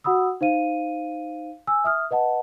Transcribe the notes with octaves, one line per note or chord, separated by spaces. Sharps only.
F#4 F#5 B5 D#6 E6
D#4 C5 F5 D#7
G#5 E6
E5 D#6 F6
B4 D#5 F#5 A5